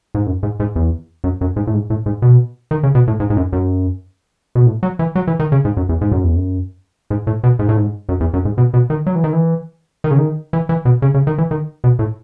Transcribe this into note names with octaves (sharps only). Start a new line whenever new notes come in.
G#2
F#2
G#2
G#2
E2
F#2
F#2
G#2
A2
G#2
A2
G#2
B2
D#3
C#3
B2
A2
G#2
G#2
F#2
F#2
B2
A2
F#3
E3
F#3
E3
D#3
C#3
G#2
F#2
E2
G#2
F#2
E2
F#2
G#2
A2
B2
G#2
A2
G#2
F#2
E2
F#2
G#2
B2
B2
D#3
F#3
E3
D#3
E3
D#3
C#3
D#3
E3
E3
B2
C#3
C#3
D#3
E3
D#3
B2
A2